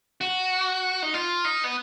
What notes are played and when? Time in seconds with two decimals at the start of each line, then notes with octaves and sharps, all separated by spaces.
0.21 F#4
1.03 D#4
1.14 F4
1.45 D#4
1.64 B3